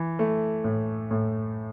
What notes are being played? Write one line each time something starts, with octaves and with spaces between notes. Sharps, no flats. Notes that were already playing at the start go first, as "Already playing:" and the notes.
Already playing: E3
A3
A2
A2